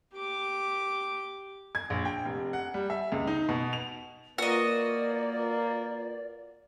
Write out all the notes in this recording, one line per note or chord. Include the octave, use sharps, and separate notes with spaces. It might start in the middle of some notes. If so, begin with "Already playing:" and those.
G4 D6
G#6
A#1
G5
F1
F#5
G3
E5
C#2
D#4
B2
F7
A#3 F4 F#4 A#4 B4 D5 D#5